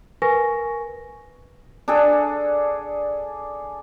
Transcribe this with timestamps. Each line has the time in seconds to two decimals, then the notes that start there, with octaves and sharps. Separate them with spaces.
0.22 A#4 B4 G#5 C#6 A#6
1.88 D4 G#4 A4